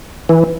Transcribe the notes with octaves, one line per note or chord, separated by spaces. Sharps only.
E3